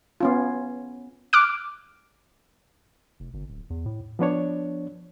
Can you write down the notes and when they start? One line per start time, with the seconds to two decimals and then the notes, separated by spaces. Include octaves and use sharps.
0.21 B3 C#4 F4
1.33 D6 F6 F#6 D7
3.20 F1
3.34 G1
3.49 D1
3.70 E2
3.86 A2
4.19 F3 B3 D4 C#5